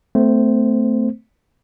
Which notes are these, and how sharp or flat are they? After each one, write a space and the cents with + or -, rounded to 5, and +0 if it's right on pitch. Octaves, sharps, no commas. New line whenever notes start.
A3 +0 C4 -40 C5 -5